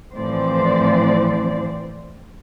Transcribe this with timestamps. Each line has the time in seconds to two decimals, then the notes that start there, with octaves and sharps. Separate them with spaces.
0.15 A2 E3 F3 C4 C5 D5